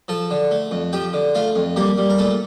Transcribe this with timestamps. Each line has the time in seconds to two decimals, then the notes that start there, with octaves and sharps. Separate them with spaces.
0.08 F3 A4 A5
0.31 D3
0.51 A3
0.71 F2
0.93 F3 G4 G5
1.13 D3
1.35 A3 F4 F5
1.56 F2
1.76 G3 A#3 G4
1.98 G3
2.10 A#4
2.18 A#2 A3 A4